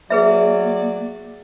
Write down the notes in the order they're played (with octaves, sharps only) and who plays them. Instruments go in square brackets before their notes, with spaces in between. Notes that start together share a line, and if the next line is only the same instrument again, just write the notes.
[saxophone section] F#3 D5 [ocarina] A#3 [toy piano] G#4 B4 E5